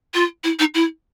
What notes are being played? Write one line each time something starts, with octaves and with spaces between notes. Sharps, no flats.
F4
E4
D#4
E4